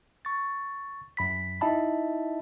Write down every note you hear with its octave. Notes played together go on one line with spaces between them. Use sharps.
C#6 A6
F#2 B5 B6
D#4 E4 D#5 E5 A5 B5